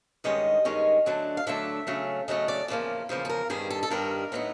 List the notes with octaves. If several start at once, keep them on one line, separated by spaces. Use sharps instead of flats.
G2 D#3 G#3 C#4 D#5
G2 D#3 G#3 C#4
D3 F#3 A3 D4
F5
D3 F#3 A3 D4 E5
C#3 F#3 A3 C#4
C#3 F#3 A3 C#4 D#5
D5
E2 C#3 F3 A#3 D5
E2 C#3 F3 A#3 C5
A4
A#4
G2 D#3 G3 G#4
A4
A4
G2 D#3 G3 A#4
A2 F#3 B3 D#4